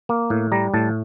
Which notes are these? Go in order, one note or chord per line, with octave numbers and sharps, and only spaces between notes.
A#3
A2
G3 A#5
A2 A5